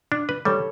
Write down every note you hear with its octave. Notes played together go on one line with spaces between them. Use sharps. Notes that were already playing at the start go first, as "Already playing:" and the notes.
D4
B4
G3 A4 C#5